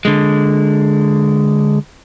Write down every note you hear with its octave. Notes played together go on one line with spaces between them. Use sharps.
D3 G#3